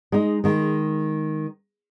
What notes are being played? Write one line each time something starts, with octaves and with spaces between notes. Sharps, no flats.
G#3 D#4
D#3 G#3